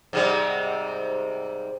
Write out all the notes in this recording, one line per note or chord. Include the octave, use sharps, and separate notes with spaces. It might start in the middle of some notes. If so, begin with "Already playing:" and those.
G#2 C3 G3